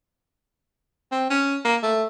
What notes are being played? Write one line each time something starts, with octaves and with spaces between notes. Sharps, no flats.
C4
C#4
A#3
A3